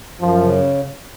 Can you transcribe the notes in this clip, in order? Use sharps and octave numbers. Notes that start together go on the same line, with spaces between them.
F#2 F3
C#3